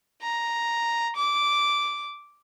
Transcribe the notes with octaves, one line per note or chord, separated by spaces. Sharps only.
A#5
D6